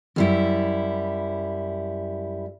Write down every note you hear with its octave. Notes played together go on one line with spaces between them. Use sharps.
F#2 G3 E4